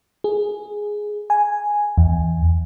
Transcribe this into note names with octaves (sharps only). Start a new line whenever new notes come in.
G#4
G#5
E2